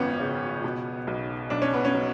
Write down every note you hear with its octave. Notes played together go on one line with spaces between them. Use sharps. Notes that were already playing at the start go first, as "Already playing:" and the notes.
Already playing: G#1 F#2 F3 B3 C#4
C#3
B2
B1
B1 D4
C#4
B3
C#4
F#3